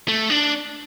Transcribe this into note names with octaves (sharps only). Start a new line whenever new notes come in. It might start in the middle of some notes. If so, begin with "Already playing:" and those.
A3
D4